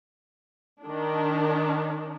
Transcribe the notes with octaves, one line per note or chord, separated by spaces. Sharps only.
D#3 D4